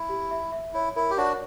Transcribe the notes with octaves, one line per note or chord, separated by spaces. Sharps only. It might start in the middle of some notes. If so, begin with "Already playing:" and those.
Already playing: E4
G4
E5
E5
E4 C#5
E4 A#4
G4
D4 F#4 C#5